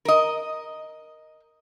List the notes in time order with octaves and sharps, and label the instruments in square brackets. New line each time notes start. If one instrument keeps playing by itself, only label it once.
[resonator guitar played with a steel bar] A#4 D#5